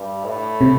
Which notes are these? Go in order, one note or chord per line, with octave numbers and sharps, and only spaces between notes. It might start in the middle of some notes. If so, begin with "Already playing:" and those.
Already playing: G2
A2
C3